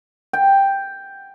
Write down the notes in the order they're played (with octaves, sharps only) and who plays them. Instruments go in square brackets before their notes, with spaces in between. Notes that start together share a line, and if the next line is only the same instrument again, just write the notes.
[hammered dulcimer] G5